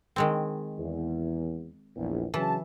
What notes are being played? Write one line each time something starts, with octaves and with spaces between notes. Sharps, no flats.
D#3 G#3 C4
E2
A#1 E2
C#3 E3 F#3 A5